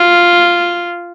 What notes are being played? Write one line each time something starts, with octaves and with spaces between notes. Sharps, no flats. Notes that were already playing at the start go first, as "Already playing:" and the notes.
Already playing: F4